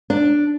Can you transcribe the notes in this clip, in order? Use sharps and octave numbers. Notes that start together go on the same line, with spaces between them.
D4